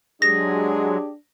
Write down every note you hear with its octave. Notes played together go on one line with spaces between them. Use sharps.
F#3 G#3 D4 G4 G#4 A#6